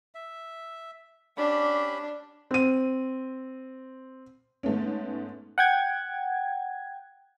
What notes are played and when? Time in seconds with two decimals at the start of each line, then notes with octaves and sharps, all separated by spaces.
0.15 E5
1.38 C#4 D4 G4 B5
2.51 C4 D#7
4.63 G#2 A3 B3 C#4
5.58 F#5 G5 G#6